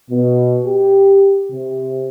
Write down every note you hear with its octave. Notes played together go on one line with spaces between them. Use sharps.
B2
G4
C3